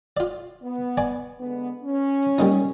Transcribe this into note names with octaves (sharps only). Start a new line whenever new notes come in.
F4 D5
B3
D5 G#5 D6
D3 G#3 B3
C#4
G3 A#3 D#4